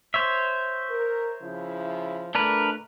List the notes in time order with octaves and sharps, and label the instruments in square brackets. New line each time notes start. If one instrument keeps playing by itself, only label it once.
[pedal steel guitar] C5 C#5 E5
[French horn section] A#4
C#3 F3 E4
[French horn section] A#2 D3 A3 [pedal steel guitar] D4 A#4 B4